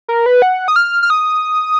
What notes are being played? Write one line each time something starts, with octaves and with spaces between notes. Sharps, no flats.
A#4
B4
F#5
D#6
F6
F6
D#6